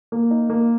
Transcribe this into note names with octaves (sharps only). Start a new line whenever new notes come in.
A#3
D#4
A#3